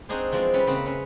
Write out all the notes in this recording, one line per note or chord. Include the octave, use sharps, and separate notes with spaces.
C4 D4 D#4 F#4 G#4 C5
E3 F3 G#3 C4 D4
G3 C#4 B4
C#3 A#3 C4 B4 B5
C#4 B4